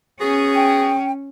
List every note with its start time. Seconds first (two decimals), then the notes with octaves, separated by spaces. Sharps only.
0.21 B3 C#4 F#4 G#4
0.55 G5